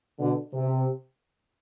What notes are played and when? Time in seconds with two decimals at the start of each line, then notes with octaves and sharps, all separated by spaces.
0.19 B2 D3
0.53 C3